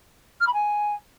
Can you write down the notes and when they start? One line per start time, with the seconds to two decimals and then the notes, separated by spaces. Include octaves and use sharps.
0.41 F6
0.47 B5
0.53 G#5